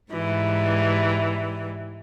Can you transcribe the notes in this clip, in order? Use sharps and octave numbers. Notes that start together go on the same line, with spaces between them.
G#2 E3 G3